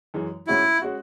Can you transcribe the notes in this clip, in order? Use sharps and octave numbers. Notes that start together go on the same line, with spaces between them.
F#2 E3 G#3
G#2 G#3 C#4 E4 F#4
G#3 C#4 F#4